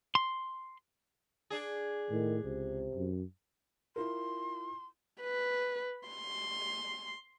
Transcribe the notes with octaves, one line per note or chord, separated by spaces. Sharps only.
C6
D4 G#4
A2 D#3
C#2 C3
F#2
E4 F4 A#4 C6
B4
C6